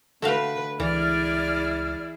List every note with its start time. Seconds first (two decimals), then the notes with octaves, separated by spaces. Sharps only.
0.22 D3 A3 F#4 B4 F5
0.80 C#2 E3 E4 G#4 D5 F6